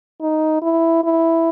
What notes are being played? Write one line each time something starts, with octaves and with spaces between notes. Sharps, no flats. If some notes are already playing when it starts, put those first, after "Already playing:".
D#4
E4
E4